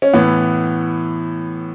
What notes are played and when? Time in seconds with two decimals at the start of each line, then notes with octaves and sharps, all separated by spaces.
0.02 C#4
0.13 A2 E3 B3